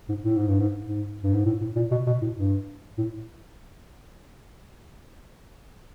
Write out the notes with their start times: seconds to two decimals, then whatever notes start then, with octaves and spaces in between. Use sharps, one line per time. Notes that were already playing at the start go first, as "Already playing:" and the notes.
0.09 G#2
0.24 A2
0.36 G#2
0.48 G2
0.60 G#2
0.85 G#2
1.23 G2
1.34 G#2
1.46 A2
1.61 A2
1.76 A#2
1.91 B2
2.07 B2
2.21 A2
2.37 G2
2.98 A2